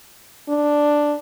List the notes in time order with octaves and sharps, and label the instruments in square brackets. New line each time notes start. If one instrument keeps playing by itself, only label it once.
[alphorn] D4